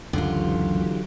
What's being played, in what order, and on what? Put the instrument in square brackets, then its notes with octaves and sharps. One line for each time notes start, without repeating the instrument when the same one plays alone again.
[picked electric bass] C#2 F#2 [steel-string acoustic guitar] D3 F4 [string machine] E3 F#3 G4